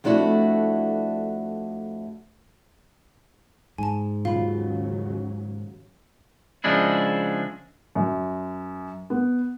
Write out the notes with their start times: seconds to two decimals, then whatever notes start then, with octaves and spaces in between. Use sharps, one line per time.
0.04 F2 A3 D4 E4 F#4
3.78 G#2 G#5 A5
4.25 D#2 C#3 F#3 F4 F5 B5
6.64 C#3 F3 G#3 D4 E4
7.95 F#2
9.10 B3